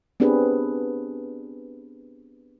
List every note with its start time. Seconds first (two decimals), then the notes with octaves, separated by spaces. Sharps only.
0.20 B3 C4 D4 G4 G#4 B4